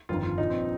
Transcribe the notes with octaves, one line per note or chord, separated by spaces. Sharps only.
G1 F2 D#3 F4
F4
A#1 A#2 F3 D#4
C4